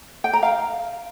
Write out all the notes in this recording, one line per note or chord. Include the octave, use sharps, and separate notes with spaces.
G5
A#5
F5